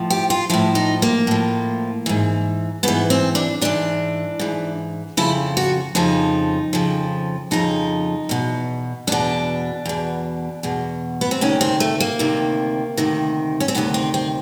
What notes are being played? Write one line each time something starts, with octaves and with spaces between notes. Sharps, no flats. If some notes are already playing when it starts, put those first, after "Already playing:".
Already playing: A2 F3
G4
F4
A2 F3 E4
D#4
A#3
A2 F3
G#2 E3
G#2 E3 B3
C4
D4
G#2 E3 D4
G#2 E3
F2 C#3 F3 E4
F#4
F2 C#3 F3 D#4
F2 C#3 F3
F2 C#3 F3 D#4
E2 B2
E2 B2 D4
E2 B2
E2 B2
B3
C4
D2 C3 D#3 C#4
C4
A3
A#3
D2 C3 D#3
D2 C3 D#3
C#4
C4
D2 C3 D#3 B3
C4
C4